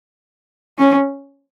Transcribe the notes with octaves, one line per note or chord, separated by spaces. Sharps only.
C#4